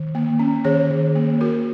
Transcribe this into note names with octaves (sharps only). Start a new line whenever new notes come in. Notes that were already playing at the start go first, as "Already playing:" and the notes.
Already playing: D#3
A#3
C#4
D#3 G#4 C#5
D#3
A#3
A#3 F#4 A#4